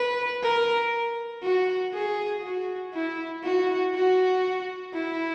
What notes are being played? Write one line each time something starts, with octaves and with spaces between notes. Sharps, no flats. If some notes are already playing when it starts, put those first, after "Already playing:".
Already playing: B4
A#4
F#4
G#4
F#4
E4
F#4
F#4
E4